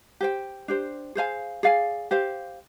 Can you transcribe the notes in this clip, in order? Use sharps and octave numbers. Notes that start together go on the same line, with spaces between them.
G4 C5 G5
D4 G4 C5
G#4 C5 F5 G#5
G#4 D5 F5 G#5
G4 C5 F5